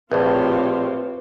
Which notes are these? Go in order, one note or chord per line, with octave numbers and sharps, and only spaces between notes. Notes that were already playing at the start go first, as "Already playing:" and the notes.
A#1 A2 C4 F4 G4 B4 C#5